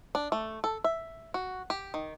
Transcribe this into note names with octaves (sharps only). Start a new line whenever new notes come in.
D4
A3
A4
E5
F#4
G4
D#3